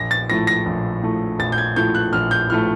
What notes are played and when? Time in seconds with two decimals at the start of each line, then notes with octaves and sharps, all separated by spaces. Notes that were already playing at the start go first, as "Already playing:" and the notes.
Already playing: A#1 A#6
0.11 A6
0.29 A2 F3 A3 A#6
0.47 A#6
0.66 A#1
1.02 A2 F3 A3
1.39 A#1 A6
1.52 G6
1.58 G#6
1.76 A2 F3 A3 G6
1.95 F#6
2.13 A#1 F6
2.31 G6
2.49 A2 F3 A3 F6